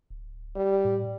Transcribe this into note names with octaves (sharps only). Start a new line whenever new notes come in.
D1
G3
A2